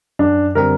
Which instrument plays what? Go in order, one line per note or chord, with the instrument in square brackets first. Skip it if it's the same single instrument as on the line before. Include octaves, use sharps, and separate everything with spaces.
[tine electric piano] F#2 [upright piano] D4
[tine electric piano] D3 G3 C4 [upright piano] A#4